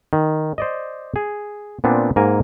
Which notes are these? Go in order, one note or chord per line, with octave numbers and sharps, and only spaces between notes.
D#3
C5 D5 D#5
G#4
A#2 B3 C4 D4
G#2 A#3 A#4 G#5